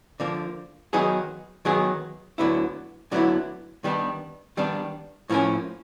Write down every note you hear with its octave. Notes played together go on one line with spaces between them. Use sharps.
D3 F3 A#3
D#3 F#3 B3 D#4 G#4
D#3 F#3 B3 D#4 G#4
D2 D3 F#3 B3 E4
D2 D3 F#3 B3 E4
D#3 G3 B3 D4
D#3 G3 B3 D4
A2 F3 A#3 C#4